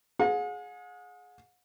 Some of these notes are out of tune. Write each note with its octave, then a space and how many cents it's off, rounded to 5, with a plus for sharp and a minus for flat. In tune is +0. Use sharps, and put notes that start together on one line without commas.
G#4 +15 F#5 -45